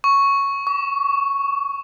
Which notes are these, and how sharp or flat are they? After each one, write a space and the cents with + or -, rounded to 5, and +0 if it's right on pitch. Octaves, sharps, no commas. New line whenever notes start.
C#6 +0
C#6 +35